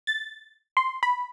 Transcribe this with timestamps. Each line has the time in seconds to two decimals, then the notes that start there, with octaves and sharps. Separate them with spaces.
0.07 A6
0.77 C6
1.03 B5